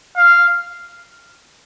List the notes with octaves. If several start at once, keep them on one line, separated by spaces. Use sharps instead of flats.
F5